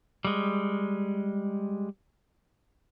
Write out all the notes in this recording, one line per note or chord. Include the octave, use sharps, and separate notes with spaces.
G3 G#3